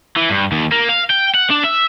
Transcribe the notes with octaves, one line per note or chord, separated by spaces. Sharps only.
E3
G2
D#2
A#3
F5
G5
F#5
D4
E5